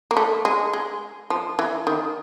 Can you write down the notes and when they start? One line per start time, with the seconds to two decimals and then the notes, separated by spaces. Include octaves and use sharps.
0.11 A#3
0.17 A3
0.45 G#3
0.73 G#3
1.30 F3
1.59 E3
1.87 D#3